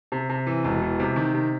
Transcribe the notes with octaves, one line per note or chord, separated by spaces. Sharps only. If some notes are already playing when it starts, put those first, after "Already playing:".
C3
C3
E3
E1
E3
C3
D#3
C3